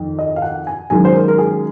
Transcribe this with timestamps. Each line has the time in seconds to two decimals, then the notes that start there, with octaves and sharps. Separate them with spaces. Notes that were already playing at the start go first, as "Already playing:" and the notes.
Already playing: F2 D#3
0.19 D#5
0.36 F5
0.42 F#5
0.67 G#5
0.90 F#2 D#3 G#3 G#5
1.05 C5
1.15 A#4
1.28 A#4
1.38 G#4